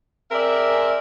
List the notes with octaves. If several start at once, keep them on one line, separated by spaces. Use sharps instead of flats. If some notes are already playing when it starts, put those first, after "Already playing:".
C4 G#4 A#4 D5 E5